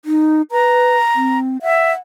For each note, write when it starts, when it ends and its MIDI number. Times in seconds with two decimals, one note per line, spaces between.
0.05 0.42 63
0.52 0.96 71
0.52 1.39 82
1.15 1.57 60
1.62 1.92 76
1.62 1.98 78